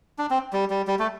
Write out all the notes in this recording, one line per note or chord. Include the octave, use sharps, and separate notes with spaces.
D4
C4
G3
G3
G3
A3